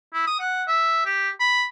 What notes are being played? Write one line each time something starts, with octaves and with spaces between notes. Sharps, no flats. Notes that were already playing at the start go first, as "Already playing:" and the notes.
E4
D#6
F#5
E5
G4
B5